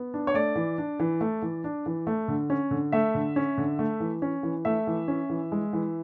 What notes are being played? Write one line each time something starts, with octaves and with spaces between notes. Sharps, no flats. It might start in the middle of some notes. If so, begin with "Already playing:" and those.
Already playing: B3
D4
C#5
A3 D5
E3
D4
E3
A3
E3
D4
E3
A3
D3
C#4
D3
A3 E5
D3
C#4
D3
A3
E3
C#4
E3
A3 E5
E3
C#4
E3
G#3
E3